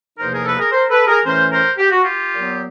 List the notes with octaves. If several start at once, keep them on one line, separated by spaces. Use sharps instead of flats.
E2 C3 F3 A#3 D#4 A#4 C5
G#4 A#4
A4 B4
G#4 A#4
A#4 C5
A4 B4
G#4 A#4
A2 E3 A3 C#4 A#4 C5
A#4 C5
G4
F#4
F4 G4
A#2 F#3 B3